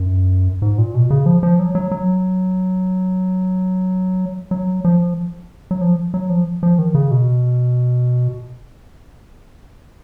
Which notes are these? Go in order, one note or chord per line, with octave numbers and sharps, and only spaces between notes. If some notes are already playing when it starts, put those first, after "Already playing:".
Already playing: F#2
G#2
A#2
B2
C#3
F3
F3
F#3
F#3
F#3
F#3
F3
F#3
F3
F#3
F3
F3
D#3
C#3
B2